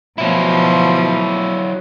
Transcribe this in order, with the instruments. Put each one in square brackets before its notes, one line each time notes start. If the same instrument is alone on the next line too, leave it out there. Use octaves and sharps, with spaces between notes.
[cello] B2 F3 [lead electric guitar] F#3 E4